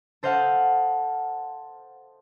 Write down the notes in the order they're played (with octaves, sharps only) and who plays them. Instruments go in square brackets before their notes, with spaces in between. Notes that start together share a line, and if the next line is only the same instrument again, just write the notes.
[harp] A4 C5 D#5 F5 F#5 A5